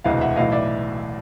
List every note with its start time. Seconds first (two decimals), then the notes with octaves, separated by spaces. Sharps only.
0.04 E1 D2 C3 E3 D#5 F5
0.21 E5 F#5
0.36 B1 A2 E3 D#5 F5
0.52 D5 E5